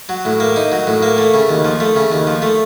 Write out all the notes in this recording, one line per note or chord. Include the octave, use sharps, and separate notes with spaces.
F#3
A2
A#3
D#4
F#3
A2
A#3
A3
C#3
D#2
F3
A3
C#3
D#2
F3
A3